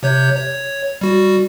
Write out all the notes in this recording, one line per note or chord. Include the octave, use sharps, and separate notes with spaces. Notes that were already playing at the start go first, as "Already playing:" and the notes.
C3 C#5 G6
C#5
G3 F#4